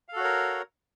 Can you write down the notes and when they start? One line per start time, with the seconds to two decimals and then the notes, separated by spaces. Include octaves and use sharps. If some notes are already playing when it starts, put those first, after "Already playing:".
0.08 F5
0.12 A4
0.16 F#4
0.20 C#5
0.24 A#4